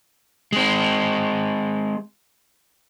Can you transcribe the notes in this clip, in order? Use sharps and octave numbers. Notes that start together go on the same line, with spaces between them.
G#3 C4